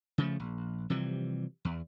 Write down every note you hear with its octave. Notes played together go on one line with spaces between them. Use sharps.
C#3 F3 A3
A#1
C3 E3 F3 G3
E2